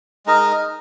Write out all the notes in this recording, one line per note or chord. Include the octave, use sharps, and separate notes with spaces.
G#3 D#4 A#4 D#5